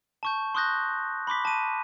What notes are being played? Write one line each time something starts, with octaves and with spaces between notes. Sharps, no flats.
A5 C#6 G6
C6 C#6 D#6 F#6 G6 A#6
B5 C6 D6 B6
A5 D#7